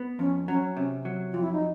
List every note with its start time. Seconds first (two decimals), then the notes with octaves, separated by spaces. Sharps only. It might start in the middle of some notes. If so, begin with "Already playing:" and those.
Already playing: B3
0.19 F2 C#4
0.48 F#3 C#4
0.76 C3 C#4
1.05 F#3
1.32 F2 F4
1.41 E4
1.52 D#4